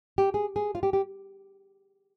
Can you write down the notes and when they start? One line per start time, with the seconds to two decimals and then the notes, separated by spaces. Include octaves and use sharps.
0.18 G4
0.34 G#4
0.56 G#4
0.75 F4
0.83 G4
0.93 G4